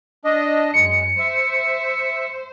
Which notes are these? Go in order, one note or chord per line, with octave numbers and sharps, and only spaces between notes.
D4 D#5
F#2 G#3 C#7
C5 E5